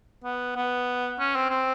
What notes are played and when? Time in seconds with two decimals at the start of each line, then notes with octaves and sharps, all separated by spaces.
0.24 B3
0.56 B3
1.19 C#4
1.35 C4
1.50 C4